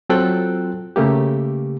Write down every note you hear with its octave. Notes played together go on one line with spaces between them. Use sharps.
F#3 C4 F4 A4 G5 F#6
C#3 A3 A#3 G4